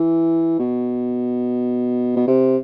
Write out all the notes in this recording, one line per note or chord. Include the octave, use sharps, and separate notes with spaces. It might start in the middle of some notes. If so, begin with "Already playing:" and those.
Already playing: E3
B2
B2
C3